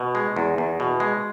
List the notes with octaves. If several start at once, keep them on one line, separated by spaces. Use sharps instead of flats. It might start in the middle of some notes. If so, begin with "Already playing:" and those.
Already playing: B2
G#3
E2
E2
B2
G#3